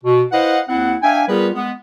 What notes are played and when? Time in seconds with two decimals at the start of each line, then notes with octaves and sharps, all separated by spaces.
0.04 B2
0.33 E4 B4 C5 D#5 F5 F#5
0.68 D#2 C4 E4 F#5
1.03 D4 E5 F5 G5 G#5
1.28 G3 B3 F4 G#4 A#4 B4
1.54 G#3 B3